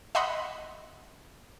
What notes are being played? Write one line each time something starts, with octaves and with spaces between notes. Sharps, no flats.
D#5 E5 F#5 B5 C6